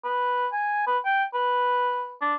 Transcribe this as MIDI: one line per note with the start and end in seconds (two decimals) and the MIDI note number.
0.04 0.47 71
0.53 0.84 80
0.87 0.98 71
1.05 1.24 79
1.34 2.14 71
2.21 2.35 62